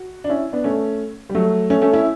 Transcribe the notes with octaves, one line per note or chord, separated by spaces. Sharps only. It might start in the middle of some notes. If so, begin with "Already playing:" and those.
Already playing: F#4
D4
C#4 E4
B3 D4
A3 C#4
G3
F#3 A3
A3 C#4
A3 C#4
C#4 E4